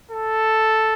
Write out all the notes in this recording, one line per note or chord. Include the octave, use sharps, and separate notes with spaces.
A4